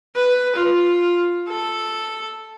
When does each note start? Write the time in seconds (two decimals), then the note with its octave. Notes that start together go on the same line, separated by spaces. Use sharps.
0.16 B4
0.56 F4
1.49 A4